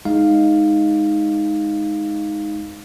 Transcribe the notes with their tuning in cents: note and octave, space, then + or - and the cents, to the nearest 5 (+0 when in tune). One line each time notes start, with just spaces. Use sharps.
G#3 +5 D#4 +0 F5 +0